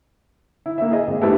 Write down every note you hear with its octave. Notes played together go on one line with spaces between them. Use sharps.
E4
A#3 E4 E5
G#4 D#5
G#1
G3 A3 B3 D4 E4 A4